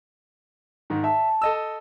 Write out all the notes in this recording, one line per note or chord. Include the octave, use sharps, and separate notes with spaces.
G#2 D#3
E5 A5
A4 D#5 E6